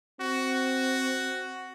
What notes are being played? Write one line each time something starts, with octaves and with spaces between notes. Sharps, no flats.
C4 F#4